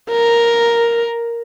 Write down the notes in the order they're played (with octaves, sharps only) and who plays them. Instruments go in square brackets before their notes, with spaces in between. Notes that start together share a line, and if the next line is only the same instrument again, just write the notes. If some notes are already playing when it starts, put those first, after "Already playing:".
[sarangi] A#4